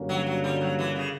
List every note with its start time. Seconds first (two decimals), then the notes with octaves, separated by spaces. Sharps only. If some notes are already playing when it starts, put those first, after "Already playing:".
Already playing: G2 D3 A#3 C#4 F#4
0.09 F#3
0.26 F#3
0.44 G3
0.61 F#3
0.79 E3
0.96 C#3